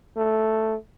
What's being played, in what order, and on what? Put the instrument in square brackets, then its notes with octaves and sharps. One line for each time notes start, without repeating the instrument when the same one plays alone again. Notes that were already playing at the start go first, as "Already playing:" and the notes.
[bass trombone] A3